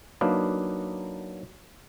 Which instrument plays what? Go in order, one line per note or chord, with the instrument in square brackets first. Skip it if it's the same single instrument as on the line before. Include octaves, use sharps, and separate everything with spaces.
[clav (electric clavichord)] F#3 A#3 D4 D#4 B4 F5